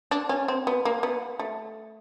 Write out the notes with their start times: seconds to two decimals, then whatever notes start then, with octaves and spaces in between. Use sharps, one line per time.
0.11 D4
0.29 C#4
0.48 C4
0.67 B3
0.85 A#3
1.03 B3
1.39 A3